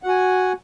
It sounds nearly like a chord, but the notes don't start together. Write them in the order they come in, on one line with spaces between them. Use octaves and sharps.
F#5 F#4 G#5